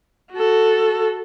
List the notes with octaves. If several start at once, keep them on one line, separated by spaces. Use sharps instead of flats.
F#4 A4